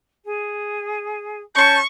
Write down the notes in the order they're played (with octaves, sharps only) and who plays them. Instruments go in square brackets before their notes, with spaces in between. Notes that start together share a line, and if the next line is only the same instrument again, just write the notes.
[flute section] G#4
[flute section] C#4 A5 G6 [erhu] C#6